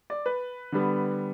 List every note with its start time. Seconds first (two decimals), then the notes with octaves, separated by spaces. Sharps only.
0.10 D5
0.26 B4
0.72 D3 G3 B3